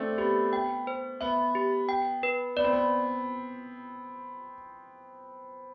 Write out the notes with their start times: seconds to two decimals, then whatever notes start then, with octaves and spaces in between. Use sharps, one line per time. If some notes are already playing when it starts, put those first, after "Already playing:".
Already playing: A3 C4 D4
0.18 B3 G4
0.53 G5
0.87 C5
1.21 B3 E5
1.55 G4
1.89 G5
2.23 B4
2.57 B3 D5
2.64 C4
2.73 B3